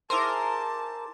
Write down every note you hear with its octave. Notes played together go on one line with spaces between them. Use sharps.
E4 G#4 A#4 C5 A5 C6 D6